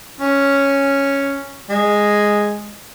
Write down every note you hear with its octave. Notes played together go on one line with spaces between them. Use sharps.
C#4
G#3